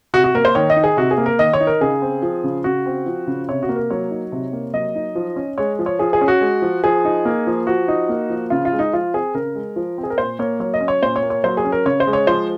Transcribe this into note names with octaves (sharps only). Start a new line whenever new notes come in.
C3 F#4
F#4
A#3 A#4
C5
D#3 C#5
D#5
D#4
G#4
C3 F#4
G#4
A#3
A#4
D#3 D#5
C#5
D#4
A#4
C#3 G#4
C4
F3
C#3
C#3 F#4
C4
F3
C#3
C3 C#5
F#4
A#3
A#4
F#3 C#5
D#4
C3
A#3
F#3 D#5
D#4
F3
C#4
G#3 C#5
F3
C#5
F3 G#4
G#4
C#4
F#4
G#3
F3
F3 G#4
D#4
A#3
F3
F3 F#4
D#4
A#3
F3
C#3 F4
F4
G#3
D#4
F3 F4
C4 G#4
C#3 A#4
G#3
F3
C4
G#4
A#4
A#2 C5
A#3 C#5
F#3 C#5
D#5
C#4
C#5
A#2 C5
C#5
A#3
C#5
F#3 C5
G#4
C#4
A#4
C#3 C#5
C5
G#3
C#5
F3 C5